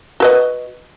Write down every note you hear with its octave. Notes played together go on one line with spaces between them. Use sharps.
F#4 B4 D#5